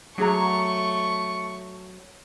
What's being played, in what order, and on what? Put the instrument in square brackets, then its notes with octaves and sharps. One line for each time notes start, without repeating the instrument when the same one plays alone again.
[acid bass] F#3 [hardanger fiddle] A3 C#6 [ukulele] D4 G#4 A#5